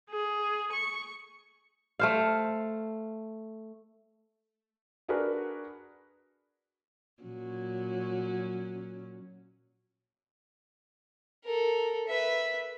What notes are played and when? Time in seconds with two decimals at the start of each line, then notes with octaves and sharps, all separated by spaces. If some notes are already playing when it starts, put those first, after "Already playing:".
0.11 G#4
0.73 C#6
1.99 A3 C5 F5
5.08 D4 F#4 G#4 A#4 B4
7.23 A#2 F#3 C#4
11.44 A4 A#4
12.08 B4 E5